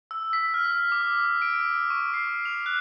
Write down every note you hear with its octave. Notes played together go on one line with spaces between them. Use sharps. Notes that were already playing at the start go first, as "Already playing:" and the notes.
E6
B6
F6
F6
D6
D7
C#6
C7
F7
F#6